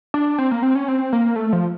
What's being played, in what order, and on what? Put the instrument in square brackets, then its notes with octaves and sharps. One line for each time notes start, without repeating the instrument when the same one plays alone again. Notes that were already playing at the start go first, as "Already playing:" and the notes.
[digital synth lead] D4
C4
A#3
C4
C#4
C4
A#3
A3
F3